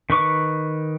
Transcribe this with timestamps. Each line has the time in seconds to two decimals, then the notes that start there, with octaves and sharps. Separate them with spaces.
0.10 D#3 B4 C#6 D6